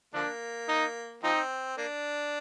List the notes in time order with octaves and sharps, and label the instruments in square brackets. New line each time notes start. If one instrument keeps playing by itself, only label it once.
[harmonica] D3 F3 A#3 [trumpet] D4
[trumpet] D#4
[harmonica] F3 C4 [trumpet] D#4
[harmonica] A#3 D4